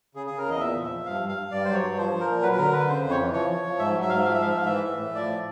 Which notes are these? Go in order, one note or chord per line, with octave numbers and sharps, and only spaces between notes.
C#3 G#4
C#3 G#4
A#4
E2 D#5
A#2 E5
F3
E5
F3
G2 F5
G2
F5
G2
G2 D5
F#3 C5
C#5
G2
F3 C5
F3
A#4
A#2
F#3 B4
B4
D3 A#4
D3 B4
C#3 C5
F2
C#5
E3
F3 C#5
F3
F3
G#2 E5
F#3
E5
G#2 F5
E5
F3 F5
E5
G#2 F5
E5
G#2 F5
E3 E5
A2
A2
F3 D5
A2